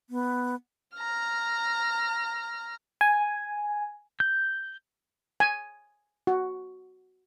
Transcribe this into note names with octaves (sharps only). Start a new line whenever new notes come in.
B3
A#5 F6
G#5
G6
G#5
F#4